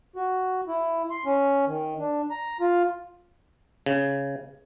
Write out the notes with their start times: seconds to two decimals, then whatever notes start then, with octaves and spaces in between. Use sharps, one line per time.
0.16 F#4
0.68 E4
1.10 C6
1.25 C#4
1.67 D#3
1.99 D4
2.30 A#5
2.61 F4
3.86 C#3